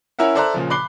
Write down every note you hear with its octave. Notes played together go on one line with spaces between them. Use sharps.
C#4 E4 A#4 E5 F#5
A4 C5 D5 E5 A#5 F#6
A#2 C#3 F3
B5 D6 F#6 C7 G7